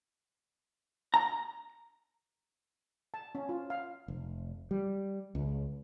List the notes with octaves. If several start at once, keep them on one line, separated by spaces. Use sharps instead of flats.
A#5
A5
C#4
F4
F5
F1
G3
C#2